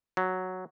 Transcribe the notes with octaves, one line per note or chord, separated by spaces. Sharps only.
F#3